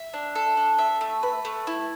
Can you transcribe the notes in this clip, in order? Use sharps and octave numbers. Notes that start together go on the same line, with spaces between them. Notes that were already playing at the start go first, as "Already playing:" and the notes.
Already playing: E5
D4
A4
D4
E5
A3
B4
A3
E4